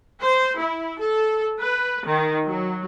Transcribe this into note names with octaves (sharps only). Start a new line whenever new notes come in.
C5
E4
A4
B4
D#3
F#3